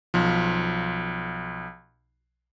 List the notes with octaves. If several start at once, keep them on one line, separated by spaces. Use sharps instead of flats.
B1 F3